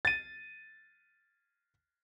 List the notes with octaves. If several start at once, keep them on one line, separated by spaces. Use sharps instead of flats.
A6 D#7